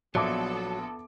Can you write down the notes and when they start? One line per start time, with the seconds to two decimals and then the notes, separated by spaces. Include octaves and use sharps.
0.15 A#1 F#3 B3 A4 E5 A5 D6